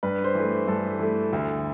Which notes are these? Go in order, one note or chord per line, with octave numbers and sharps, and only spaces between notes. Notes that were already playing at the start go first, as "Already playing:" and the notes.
G2 B4
C5
E3 A3
G2 A4
E3 A3
D2